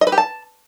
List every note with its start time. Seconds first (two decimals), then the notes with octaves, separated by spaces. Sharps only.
0.01 D#5
0.07 B4
0.12 G4
0.18 A5